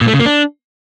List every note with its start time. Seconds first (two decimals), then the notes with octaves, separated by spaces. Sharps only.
0.01 A#2
0.07 A3
0.14 C#3
0.20 A#3
0.26 D4